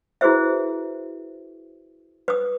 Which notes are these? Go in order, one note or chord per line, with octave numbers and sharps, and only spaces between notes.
E4 F#4 G#4 B4 C5 E5
B4 D#6